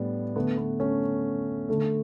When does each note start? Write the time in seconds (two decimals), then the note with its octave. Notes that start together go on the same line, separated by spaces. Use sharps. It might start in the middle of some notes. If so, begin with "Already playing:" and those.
Already playing: A2 G3 B3 D4
0.36 D3 A3 B3
0.58 B3
0.80 A3 C#4
1.69 D3 A3